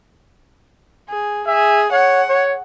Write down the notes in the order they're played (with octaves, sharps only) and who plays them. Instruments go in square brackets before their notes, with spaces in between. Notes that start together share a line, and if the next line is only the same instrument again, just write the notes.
[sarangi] G#4
[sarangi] G#4 [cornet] E5
[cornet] C#5 [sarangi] F#5
[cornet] C#5